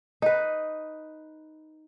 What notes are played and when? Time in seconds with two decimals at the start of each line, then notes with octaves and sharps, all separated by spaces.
0.22 D#4 B4